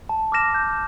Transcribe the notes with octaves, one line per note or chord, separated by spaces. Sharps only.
A5
D6 F6 A#6 E7
G6